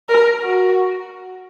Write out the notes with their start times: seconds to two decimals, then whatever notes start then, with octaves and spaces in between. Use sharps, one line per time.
0.09 A#4
0.43 F#4